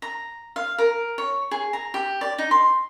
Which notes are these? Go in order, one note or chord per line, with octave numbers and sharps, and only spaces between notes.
A#5
F5
A#4
C#5
G#4
A#5
G4
D5
D#4
C6